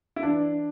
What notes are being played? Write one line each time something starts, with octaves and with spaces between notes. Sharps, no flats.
E4
E3 D4